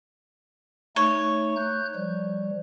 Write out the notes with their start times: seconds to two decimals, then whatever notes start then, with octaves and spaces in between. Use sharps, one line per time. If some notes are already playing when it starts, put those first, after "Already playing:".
0.96 A3 D#4 C#5
1.56 F#6 G6
1.95 F3 G3